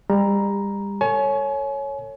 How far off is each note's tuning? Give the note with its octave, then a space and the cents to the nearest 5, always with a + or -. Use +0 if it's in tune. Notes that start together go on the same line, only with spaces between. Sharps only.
G3 +35 A#5 +10
A4 +40 C#5 +0 G#5 +35